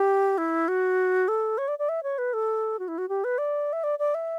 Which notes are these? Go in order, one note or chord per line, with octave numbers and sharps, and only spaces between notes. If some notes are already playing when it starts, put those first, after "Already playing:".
Already playing: G4
E4
F#4
A4
C#5
D5
D5
E5
C#5
B4
A4
F#4
E4
F#4
G4
B4
D5
E5
D5
D5
E5